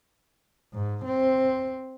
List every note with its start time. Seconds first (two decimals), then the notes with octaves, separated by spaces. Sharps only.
0.73 G#2
1.04 C4